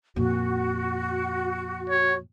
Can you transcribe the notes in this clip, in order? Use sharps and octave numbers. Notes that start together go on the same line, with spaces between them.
F2 A#2 F#4
C#5